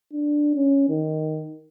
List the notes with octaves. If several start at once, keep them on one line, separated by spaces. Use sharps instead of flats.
D4
C#4
D#3